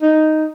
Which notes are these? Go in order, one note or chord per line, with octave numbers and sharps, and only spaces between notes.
D#4